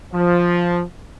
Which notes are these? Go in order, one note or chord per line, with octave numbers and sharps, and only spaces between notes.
F3